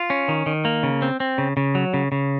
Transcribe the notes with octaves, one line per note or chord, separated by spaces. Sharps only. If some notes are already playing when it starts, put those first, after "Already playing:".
Already playing: F4
C#4
D#3
D#3
A#3
C#3
C4
C4
C#3
C#3
F#3
C#3
C#3